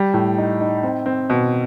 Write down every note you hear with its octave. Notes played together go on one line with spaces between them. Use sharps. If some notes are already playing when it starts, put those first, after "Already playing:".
Already playing: G3
A2
D#4
D#4
C4
C4
B2